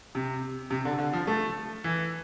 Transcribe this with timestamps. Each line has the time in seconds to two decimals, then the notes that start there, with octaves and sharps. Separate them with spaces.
0.15 C3
0.70 C3
0.85 D3
0.99 D3
1.13 F3
1.27 A3
1.84 E3